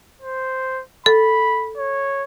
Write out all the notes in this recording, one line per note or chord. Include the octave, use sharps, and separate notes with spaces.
C5
A4 B5
C#5